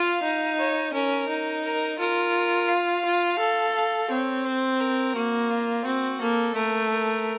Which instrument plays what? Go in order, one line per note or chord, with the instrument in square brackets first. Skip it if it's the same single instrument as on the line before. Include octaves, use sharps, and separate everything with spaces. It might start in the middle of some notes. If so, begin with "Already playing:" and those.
Already playing: [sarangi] F4 [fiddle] F5
[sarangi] D#4
[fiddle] C#5
[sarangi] C#4 [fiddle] A#4
[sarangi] D#4
[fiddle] A#4
[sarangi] F4 [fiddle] A#4
[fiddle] F5
[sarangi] F4
A4
[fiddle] F5
[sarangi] C4 [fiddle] C#5
[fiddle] C5
A#4
[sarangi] A#3 [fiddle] F#4
[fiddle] F4
[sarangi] C4 [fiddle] F#4
[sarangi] A#3 [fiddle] A4
[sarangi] A3 [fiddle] A#4
[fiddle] A#4